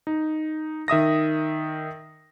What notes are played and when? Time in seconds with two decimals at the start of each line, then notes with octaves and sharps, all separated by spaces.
0.07 D#4
0.88 D#3 E5 D#6 A#6